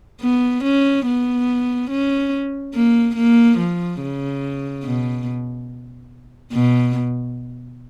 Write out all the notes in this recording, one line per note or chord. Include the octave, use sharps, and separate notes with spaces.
B3
C#4
B3
C#4
A#3
A#3
F3
C#3
B2
B2